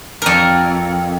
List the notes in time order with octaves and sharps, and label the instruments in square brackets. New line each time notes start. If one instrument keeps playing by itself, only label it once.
[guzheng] F2 A#4